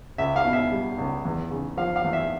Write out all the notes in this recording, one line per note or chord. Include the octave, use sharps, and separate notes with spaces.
C#2 E5
F5
B2
E5
G3
C#2
E2
C#3
F3 F5
F5
E2
E5